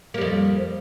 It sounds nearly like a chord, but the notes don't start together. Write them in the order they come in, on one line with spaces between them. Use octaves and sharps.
A#3 G3 F2